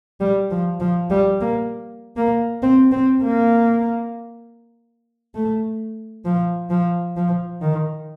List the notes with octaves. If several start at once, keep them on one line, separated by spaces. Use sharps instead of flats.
G3
F3
F3
G3
A#3
A#3
C4
C4
A#3
A3
F3
F3
F3
D#3